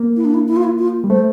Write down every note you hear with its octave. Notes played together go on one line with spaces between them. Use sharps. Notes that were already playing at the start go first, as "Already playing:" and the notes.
Already playing: A#3
E4
D4
E4
E4
F4
E4
F4
G3
A3 C5